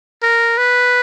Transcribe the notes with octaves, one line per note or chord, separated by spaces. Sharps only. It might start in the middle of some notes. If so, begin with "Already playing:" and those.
A#4
B4